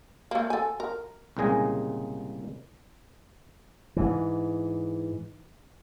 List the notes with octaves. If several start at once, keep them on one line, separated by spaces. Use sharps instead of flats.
A3 A#3
A4 G#5
A#4
C2 A#2 C#3 G#3 D#5 G#5
G#2 E3